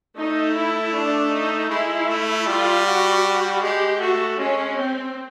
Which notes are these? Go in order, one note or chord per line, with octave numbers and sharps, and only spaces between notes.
A3 D#4
E4
D4
D#4
G#3 E4
A3
G3 F4
F#4
G#3 G4
A3 F#4
G#3 C#4
C4